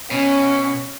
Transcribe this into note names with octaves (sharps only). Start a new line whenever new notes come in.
B2 C#4